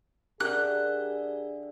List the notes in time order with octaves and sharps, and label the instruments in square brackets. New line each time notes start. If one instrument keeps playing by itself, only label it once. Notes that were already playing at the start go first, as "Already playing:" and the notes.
[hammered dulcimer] D3 E5 G5 [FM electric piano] G4 A#4 D5 [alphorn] G#4 [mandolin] F#6